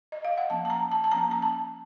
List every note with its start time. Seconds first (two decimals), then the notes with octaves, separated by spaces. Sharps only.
0.12 D#5
0.25 F5
0.38 F#5
0.50 F3 A#3 C#4 A5
0.65 A5
0.70 A#5
0.92 A5
1.04 A5
1.12 F3 A#3 C#4 A#5
1.31 A#5
1.42 A5